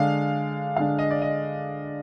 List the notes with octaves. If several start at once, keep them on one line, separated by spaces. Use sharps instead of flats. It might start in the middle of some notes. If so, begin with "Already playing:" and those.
Already playing: D3 G#3 D4 F5
D3 G#3 D4 F5
D#5
D5
D#5